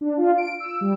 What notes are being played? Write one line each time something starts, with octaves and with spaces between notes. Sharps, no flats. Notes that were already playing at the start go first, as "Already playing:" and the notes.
D4
F4
D7
E6
G3